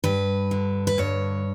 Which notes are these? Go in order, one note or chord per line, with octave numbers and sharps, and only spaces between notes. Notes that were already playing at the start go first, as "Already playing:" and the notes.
G2 B4
D3
B4
G2 C#5